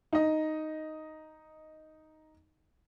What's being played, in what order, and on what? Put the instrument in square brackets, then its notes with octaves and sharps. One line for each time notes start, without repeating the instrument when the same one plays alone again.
[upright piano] D#4 D#5